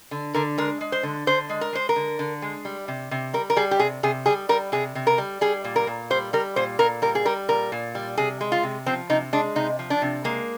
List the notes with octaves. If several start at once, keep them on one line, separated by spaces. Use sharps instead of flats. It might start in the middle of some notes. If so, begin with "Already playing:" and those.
D3
D3 A#4
G#3 A#4
G#3
C5
D3
D3 C5
G#3
A#4
G#3 C5
A#4
D3
D3
G#3
G3
C3
C3
G3 A#4
A#4
G3 G#4
G4
C3 G#4
C3 G#4
G3 G#4
G3 A#4
C3 G#4
C3
A#4
G3
G3 G#4
A#2
A#4
A#2
G3 C5
G3 A#4
A#2 C5
A#2 A#4
G3 A#4
G#4
G3 A#4
A#2 A#4
A#2
G3
C3 G#4
G#3
F4
C3
F3 C4
C3 D#4
G#3 D4
C3 D#4
F3
D4
C3
G#3 A#3